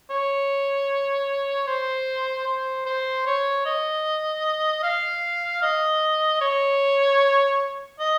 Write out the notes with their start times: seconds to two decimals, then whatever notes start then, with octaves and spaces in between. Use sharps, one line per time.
0.10 C#5
1.67 C5
2.47 C5
2.86 C5
3.27 C#5
3.66 D#5
4.83 F5
5.63 D#5
6.41 C#5
8.00 D#5